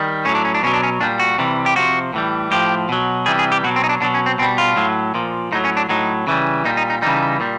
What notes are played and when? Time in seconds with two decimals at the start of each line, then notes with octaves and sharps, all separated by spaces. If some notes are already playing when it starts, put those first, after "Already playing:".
Already playing: D#3 G3
0.25 A2 F#3 C#4
0.35 D4
0.45 C#4
0.54 D4
0.63 B2 F#3 C#4
0.74 D4
0.83 C#4
1.00 A#2 G3 D4
1.19 F#4
1.38 C3 E3 G3
1.66 G4
1.76 C3 F3 F#4
2.13 A2 E3 G3
2.51 A2 F3 G4
2.89 B2 F#3
3.26 C3 E3 G3 G#4
3.39 G#4
3.52 G4
3.64 B2 F#3 F#4
3.76 C4
3.84 D#4
3.89 D4
4.01 B2 F#3 D4
4.14 C#4
4.26 C4
4.39 B2 C4
4.42 G3
4.58 F4
4.77 A2 F#3
5.14 A#2 F3
5.52 A2 F#3 D#4
5.65 C#4
5.77 D4
5.89 A2 F#3 D#4
6.27 C#3 E3 G3
6.65 A#2 G3 D#4
6.77 D#4
6.90 D#4
7.02 C#3 E3 G3 D#4
7.40 A#2 G3